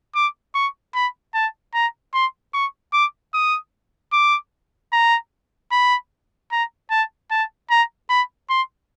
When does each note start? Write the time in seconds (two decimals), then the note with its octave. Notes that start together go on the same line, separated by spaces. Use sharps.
0.15 D6
0.55 C#6
0.95 B5
1.35 A5
1.74 A#5
2.14 C6
2.54 C#6
2.93 D6
3.34 D#6
4.13 D6
4.93 A#5
5.72 B5
6.52 A#5
6.90 A5
7.31 A5
7.71 A#5
8.10 B5
8.50 C6